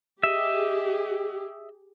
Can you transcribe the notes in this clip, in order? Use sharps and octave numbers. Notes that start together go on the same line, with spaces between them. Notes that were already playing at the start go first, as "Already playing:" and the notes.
G4 G#4 D#5 E5